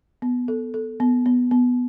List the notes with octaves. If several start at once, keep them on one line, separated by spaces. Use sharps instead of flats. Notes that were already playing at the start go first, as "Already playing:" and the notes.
B3
A4
A4
B3
B3
B3